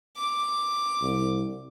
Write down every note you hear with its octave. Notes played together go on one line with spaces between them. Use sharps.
D6
C2